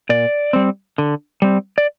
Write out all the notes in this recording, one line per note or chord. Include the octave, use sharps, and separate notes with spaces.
A#2 D5
G3 C4
D3
G3 C4
D5